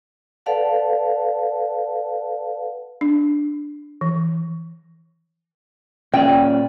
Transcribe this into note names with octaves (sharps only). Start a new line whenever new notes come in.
A4 B4 D5 F5 F#5 A5
D4
E3
A#2 C#4 D5 G5